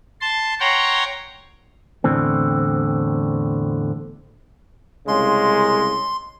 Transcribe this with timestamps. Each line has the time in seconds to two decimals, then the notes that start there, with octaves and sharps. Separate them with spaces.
0.21 A5 C6
0.60 C#5 F#5 G5 A#5 C6 C#6
2.04 E2 A2 D3 C4
5.08 C2 C#3 G#3 C6